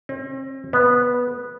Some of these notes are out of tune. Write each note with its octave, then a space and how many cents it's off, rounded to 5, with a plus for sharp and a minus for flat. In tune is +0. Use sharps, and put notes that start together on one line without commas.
C4 +40
B3 -10